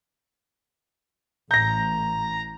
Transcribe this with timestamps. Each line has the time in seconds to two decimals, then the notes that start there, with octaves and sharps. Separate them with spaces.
1.51 A1 A#5 G6 A#6